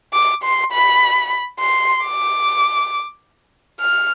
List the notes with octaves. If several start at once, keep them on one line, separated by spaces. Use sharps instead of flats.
D6
C6
B5
C6
D6
F6